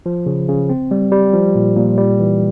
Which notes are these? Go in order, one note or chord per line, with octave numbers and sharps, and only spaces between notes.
F3
C#3
C#3
C4
G3
G3
F3
A#2
A#2
G3
E3